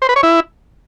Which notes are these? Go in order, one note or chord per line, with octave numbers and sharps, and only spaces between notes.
C5
B4
C#5
E4